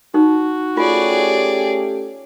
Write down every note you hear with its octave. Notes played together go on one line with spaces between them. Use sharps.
D#4 F#4
A3 C#4 F4 G4 G#4 D5